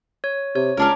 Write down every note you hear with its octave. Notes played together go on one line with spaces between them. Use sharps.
C#5
C3 C#5
C#2 C#4 D4 A#4